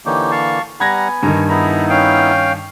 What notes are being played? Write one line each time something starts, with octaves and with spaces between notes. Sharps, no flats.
D3 E3 A#3 D#4 G4 C#5
F5 A5 C#6
G3 B3 F#5 G#5 A#5 B5 G#6 A#6
G2 D#3 A#5
B3 D#4 E4 G#4 A#5 B5
C#4 F5 G5